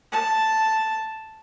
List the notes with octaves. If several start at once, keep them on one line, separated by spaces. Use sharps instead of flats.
A5